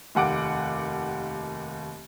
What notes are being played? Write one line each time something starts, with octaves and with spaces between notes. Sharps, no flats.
F1 D#2 F#5 D6 D7